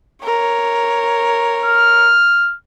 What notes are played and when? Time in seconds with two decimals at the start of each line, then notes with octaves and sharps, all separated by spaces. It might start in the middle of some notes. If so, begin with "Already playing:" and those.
0.24 A#4 C#5
1.64 F6